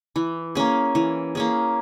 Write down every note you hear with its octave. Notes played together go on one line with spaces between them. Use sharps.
E3
A#3 C#4 G#4
E3
A#3 C#4 G#4